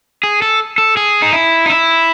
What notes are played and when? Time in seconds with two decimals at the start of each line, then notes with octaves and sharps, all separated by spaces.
0.23 G#4
0.42 A4
0.78 A4
0.97 G#4
1.22 D#4
1.33 E4
1.66 D#4
1.70 E4